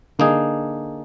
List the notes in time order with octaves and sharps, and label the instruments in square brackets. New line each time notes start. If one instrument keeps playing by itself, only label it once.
[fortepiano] D3 [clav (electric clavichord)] A#3 D#4 G#4